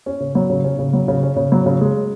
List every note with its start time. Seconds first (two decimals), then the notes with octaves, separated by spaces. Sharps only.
0.06 C#4
0.20 C#3
0.35 F#3
0.50 C#3
0.64 C#4
0.79 C#3
0.93 F#3
1.08 C#3
1.23 C#4
1.36 C#3
1.52 F#3
1.66 C#3
1.81 G#3